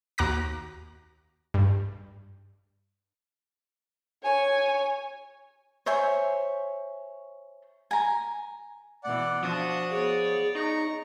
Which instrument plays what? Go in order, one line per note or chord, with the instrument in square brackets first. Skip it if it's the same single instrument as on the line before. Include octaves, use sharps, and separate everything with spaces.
[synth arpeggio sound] D#2 F#4 A#5 D6 F#6 A#6
G2
[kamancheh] C#5 G#5
[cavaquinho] C5 C#5 E5 G#5
G#5 A#5
[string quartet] B2 E3 [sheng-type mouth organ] D5 F#5
[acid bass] F3 [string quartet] D4 F#5 [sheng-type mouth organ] F#4 D#6
[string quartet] B3 C#5 D5 [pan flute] G#4
[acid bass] D#4 [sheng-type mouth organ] A#5 C#6